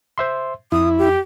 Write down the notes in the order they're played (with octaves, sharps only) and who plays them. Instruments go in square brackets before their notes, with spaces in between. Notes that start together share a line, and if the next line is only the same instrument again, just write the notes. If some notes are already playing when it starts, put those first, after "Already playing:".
[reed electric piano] C5 E5 C6
[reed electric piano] F2 [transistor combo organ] E4 [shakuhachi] D#6
[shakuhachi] G4